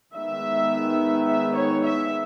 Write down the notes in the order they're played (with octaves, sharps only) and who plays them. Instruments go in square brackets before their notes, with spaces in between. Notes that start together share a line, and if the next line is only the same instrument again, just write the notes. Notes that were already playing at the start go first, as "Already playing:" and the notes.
[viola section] D#3 G#3 B3 E5
E5
C#5
E5